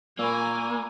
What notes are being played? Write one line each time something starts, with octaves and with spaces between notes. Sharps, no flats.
A#2 A#3 G#5 B5 C#6 E6